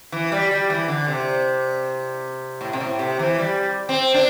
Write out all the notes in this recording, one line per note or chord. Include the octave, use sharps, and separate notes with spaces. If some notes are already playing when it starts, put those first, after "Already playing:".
E3
G3
G3
E3
D3
C3
A2
C3
A2
C3
E3
G3
C4
D4